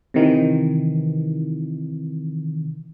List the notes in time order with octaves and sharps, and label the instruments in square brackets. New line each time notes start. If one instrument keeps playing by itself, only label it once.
[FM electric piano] C3 D#3 E3